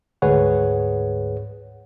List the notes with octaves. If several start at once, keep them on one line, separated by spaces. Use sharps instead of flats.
D2 G#2 G#4 B4 C#5 F#5